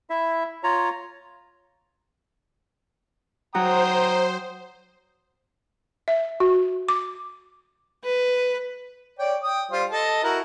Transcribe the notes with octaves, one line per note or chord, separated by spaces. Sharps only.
E4 E5
F4 C#5 A#5
F#3 F#4 C5 G5 A#5 D#6
E5
F#4
D6
B4
C#5 D5 G5
G5 D#6
G3 F4 C5
A4 D#5 A5
E4 F#4 A#4